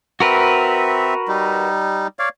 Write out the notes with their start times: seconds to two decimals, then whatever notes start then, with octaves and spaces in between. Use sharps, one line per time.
0.20 C4 F#4 A#4 B4 E5
1.28 G3 D#4
2.19 C#5 D5 F5